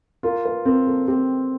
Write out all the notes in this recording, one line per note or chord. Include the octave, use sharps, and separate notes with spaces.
F4 A#4
B4
C4 A#4
A4
C4 G4